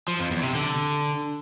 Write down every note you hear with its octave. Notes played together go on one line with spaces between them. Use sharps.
F3
F2
E2
C3
D3